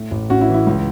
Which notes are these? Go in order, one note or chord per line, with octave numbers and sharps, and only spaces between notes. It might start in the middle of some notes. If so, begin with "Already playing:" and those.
Already playing: A2
A1
A1 C#4 F#4
E4
E3
E4
C#2